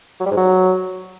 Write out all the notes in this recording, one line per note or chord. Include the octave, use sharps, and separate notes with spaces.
F#3
G3
G#2
F#3